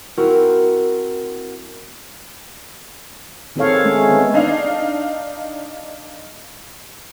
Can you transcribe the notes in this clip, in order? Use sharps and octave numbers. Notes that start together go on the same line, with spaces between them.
C4 E4 F#4 A#4
D#3 C4 G#4 A4 C#5 F5
G#3 A3 C#4
D#3 B3 B4
D4 D#4 F5